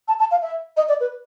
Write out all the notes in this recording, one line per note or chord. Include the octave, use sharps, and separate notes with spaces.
A5
A5
F5
E5
D#5
D5
B4